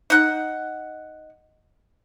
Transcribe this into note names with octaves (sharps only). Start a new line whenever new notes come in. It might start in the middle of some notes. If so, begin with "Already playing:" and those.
D#4 F#5